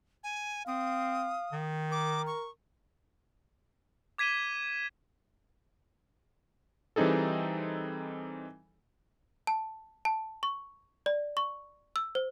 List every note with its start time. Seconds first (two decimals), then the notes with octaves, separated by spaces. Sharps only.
0.24 G#5
0.67 C4 F5 D#6
1.52 D#3
1.91 A#4 D6
2.27 C#6
4.18 D6 G#6 B6 D#7 E7 G7
6.96 E3 G3 C4 D#4 G#4 A4
9.47 A5
10.05 A5
10.43 C#6
11.06 D5
11.37 C#6
11.96 E6
12.15 C5